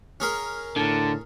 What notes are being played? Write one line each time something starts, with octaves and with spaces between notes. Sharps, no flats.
C#4 G#4 A#4
A2 D3 A5